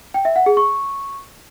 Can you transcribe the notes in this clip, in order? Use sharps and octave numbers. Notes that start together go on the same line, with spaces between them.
G5
E5
F#5
G#4
C#6